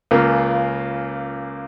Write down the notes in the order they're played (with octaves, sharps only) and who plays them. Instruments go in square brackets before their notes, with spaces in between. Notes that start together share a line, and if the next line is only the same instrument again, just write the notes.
[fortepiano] C#2 C#3 A#3 F4